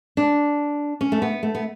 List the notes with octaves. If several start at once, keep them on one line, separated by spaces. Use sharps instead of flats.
D4
C#4
A3
B3
A3
B3